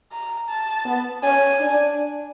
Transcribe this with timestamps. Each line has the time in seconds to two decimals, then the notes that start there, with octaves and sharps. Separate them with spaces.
0.12 A#5
0.48 A5
0.85 B3
1.23 C#4 G#5
1.60 D4